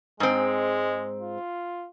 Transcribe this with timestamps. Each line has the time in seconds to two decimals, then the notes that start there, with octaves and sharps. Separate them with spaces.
0.20 G#2 G#3 C4
1.21 F4